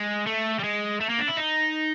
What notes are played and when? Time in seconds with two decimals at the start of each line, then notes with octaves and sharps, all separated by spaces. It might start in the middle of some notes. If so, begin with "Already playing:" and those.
Already playing: G#3
0.27 A3
0.60 G3
0.64 G#3
1.01 A3
1.10 A#3
1.19 D4
1.28 E4
1.37 D#4